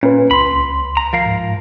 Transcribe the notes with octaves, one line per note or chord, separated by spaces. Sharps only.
A#2 C#4 B4
C#2 B5 C6
A#5
F3 A#4 F5
G#2